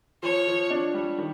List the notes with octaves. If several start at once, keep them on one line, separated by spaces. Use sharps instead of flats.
F3 C#5
F3
D4
G3
D#3